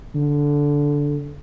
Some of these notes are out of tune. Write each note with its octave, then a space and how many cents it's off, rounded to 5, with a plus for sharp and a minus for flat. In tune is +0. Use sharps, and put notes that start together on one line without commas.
D3 -10